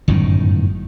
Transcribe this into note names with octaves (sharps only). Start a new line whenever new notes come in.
G1 F#2 A2 D#3